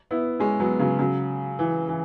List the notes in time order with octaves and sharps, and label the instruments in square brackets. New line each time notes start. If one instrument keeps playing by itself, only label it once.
[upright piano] B3 E4
G#3 C#4
F#3 B3
C#3 F#3
C#3 F#3
E3
E3